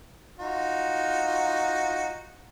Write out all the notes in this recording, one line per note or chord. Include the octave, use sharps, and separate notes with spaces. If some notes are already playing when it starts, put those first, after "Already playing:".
D#4 F4 F#4